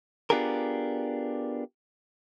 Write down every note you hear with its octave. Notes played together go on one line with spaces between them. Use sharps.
B3 D4 F4 G4 G#4 A#4